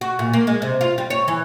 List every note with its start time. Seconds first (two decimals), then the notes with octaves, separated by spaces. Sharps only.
0.01 F#4
0.19 A#2
0.33 A#3
0.47 G#3
0.62 C3
0.81 F4
0.98 G3
1.10 C#5
1.28 E3